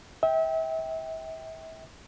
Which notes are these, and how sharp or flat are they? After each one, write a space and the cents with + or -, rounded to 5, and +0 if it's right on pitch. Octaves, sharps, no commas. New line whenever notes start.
E5 -35 G5 +0